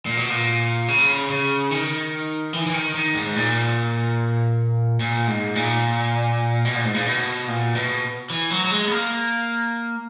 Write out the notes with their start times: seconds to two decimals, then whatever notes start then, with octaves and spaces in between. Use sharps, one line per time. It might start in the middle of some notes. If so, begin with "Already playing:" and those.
0.06 A#2
0.17 B2
0.30 A#2
0.88 C#3
1.30 C#3
1.71 D#3
2.53 E3
2.66 E3
2.73 D#3
2.94 D#3
3.14 G#2
3.36 A#2
5.00 A#2
5.27 G#2
5.55 A#2
6.65 B2
6.75 A#2
6.85 G#2
6.95 A#2
7.06 B2
7.48 A#2
7.75 B2
8.30 E3
8.50 F#3
8.64 F#3
8.71 G#3
8.87 B3
8.91 A#3